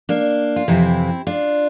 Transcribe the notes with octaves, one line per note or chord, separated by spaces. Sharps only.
A#3 D4
F4
F2 C3 E3 C4 E4
D4 F4